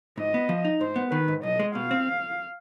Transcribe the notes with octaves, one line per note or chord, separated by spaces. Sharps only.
G#2 D#5
B3
F3
D#4
G#2 C5
B3
D#3 B4
G#2
B1 D#5
G#3
B2 F5
C4